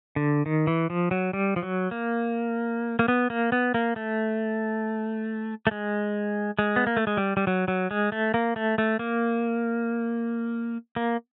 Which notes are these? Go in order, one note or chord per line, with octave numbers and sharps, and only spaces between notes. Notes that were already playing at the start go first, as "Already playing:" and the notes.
D3
D#3
E3
F3
F#3
G3
F3
F#3
A#3
A#3
B3
A#3
B3
A#3
A3
A3
G#3
G#3
B3
A#3
A3
G#3
G3
G3
F#3
F#3
G#3
A3
A#3
A3
A3
A#3
A#3